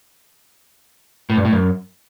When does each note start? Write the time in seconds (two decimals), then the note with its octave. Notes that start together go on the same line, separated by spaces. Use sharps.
1.30 A2
1.37 G2
1.45 A2
1.52 F#2